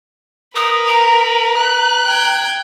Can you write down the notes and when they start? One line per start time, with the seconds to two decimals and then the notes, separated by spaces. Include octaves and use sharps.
0.56 A#4 B4 D#6
0.88 A#5
1.57 F#6
2.06 G5 G#6